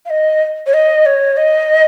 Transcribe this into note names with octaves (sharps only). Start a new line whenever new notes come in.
F5
D#5
C#5
D#5
C#5
D#5